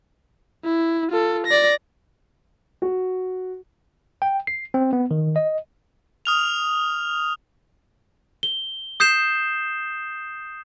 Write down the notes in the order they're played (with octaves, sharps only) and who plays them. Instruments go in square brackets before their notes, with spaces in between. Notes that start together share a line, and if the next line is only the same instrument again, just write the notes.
[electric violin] E4
F4 A4
D5 A#6
[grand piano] F#4
[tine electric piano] G5
C7
C4
B3
D#3
D#5
[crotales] D#6 F6 F7
[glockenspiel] G7
D#6 G6 C7 E7